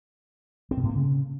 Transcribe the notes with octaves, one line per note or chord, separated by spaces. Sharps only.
C4
B2
A2
A#3
C#3